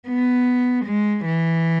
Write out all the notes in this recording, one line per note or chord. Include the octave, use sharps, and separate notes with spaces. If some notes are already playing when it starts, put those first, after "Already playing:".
B3
G#3
E3